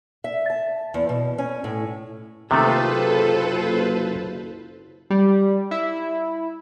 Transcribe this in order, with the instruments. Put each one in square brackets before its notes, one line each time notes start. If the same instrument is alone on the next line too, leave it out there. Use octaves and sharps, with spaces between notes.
[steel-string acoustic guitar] E5
A5
E2
B2
C#4
A2
[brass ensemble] F#1 [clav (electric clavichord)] C3 D#3 A3 [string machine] F4 B4 C5 [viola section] A4
[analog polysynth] G3
E4